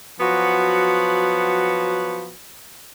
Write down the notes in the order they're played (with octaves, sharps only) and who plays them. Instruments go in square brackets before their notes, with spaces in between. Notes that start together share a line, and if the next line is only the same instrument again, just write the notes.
[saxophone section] F3 F#3 B3 F#4